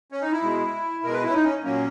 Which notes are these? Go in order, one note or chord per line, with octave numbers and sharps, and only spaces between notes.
C#4
D#4
E4
B2 G#3
B2 G#3 A#4
B4
E4
C#4
D#4
C#4
A#2 F#3 A#3 C#4